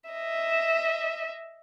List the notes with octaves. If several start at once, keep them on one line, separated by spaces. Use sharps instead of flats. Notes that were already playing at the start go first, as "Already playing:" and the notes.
D#5 E5